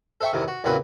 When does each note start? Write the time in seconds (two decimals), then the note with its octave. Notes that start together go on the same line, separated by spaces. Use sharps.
0.21 A4 C5 E5 G5 C#6
0.33 E2 C3 D#3
0.48 F#4
0.64 E2 A#2 C#3 C4 F#4 B4